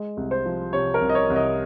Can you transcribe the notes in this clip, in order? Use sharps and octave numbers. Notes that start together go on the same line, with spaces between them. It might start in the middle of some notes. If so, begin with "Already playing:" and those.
Already playing: G#3
C2
C5
F3
C3 C#5
A#4
C2
D#5
C#5
C2
D#5